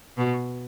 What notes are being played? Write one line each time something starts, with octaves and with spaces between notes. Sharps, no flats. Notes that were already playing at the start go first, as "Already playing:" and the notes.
B2